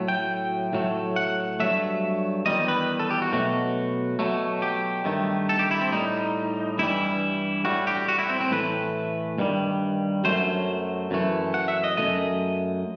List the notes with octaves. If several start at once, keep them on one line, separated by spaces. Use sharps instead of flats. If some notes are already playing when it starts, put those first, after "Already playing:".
Already playing: A2 F#3 A3
G5
A2 F#3 A3
F#5
G2 F#3 A3 E5
E2 D#3 G3 D#5
B4
A4
G4
F#4
B2 F#3 A3 F#4
B2 F#3 A3
G4
G2 D#3 A3
A4
G4
E4
C4
A2 G3 D#4
G2 E3 G3 E4
A2 G3 F#4
G4
F#4
E4
C4
C4
A2 E3 A3 B4
G2 D#3 G3
F#2 F#3 A3 C5
F#2 E3 A3
F#5
E5
D#5
F#2 E3 A3 D#5